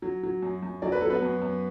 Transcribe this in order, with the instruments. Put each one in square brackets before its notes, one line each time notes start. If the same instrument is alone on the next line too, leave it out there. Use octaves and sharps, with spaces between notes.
[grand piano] F#3
F#3
F#2
F#2
F#3 D5
B4
F#3 A4
B3 B4
F#2
F#2